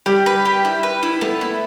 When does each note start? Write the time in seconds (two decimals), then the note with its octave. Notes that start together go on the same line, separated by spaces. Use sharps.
0.06 G3 G4
0.26 B4
0.45 G4
0.65 E4
0.83 B4
1.03 E4
1.21 A3 B3
1.41 E4